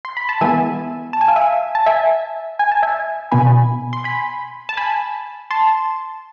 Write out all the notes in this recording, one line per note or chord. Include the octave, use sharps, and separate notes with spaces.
C6
B5
A5
E3 G#3 B3 E5 G#5
A5
G#5
F5
E5 G#5
A5
E5 G#5
G#5
A5
E5 G#5
B2 B3 G#5 B5
C6
G#5 B5
A5
G#5 B5
A5 C6